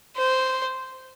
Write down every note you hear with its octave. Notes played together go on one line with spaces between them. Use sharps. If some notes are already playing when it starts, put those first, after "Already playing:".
C5